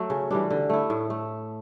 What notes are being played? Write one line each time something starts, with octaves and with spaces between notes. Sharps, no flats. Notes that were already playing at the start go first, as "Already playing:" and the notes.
Already playing: F#3 A3
C#3
E3 G3 D4
D3
A3 E4
A2
A3